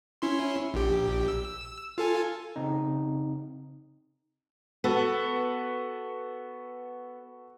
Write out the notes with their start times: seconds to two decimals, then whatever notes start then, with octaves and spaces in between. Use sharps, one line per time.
0.22 C#4 E4 C6
0.74 A#1 G4
1.28 E6
1.98 F4 A4 G#5
2.56 C#3 C4 D#4
4.84 B3 F#4 A4 B4